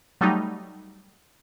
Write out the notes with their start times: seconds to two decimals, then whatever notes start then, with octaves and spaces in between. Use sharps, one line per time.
0.21 F#3 G3 A3 D#4